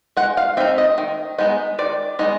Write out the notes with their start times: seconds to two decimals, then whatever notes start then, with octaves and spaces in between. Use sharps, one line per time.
0.17 G#3 F#5
0.37 F5
0.57 C4 D#4 E5
0.78 D#5
0.98 D#3
1.38 G#3 B3 D#4
1.79 D#3 D5
2.19 G#3 B3 D#4 D#5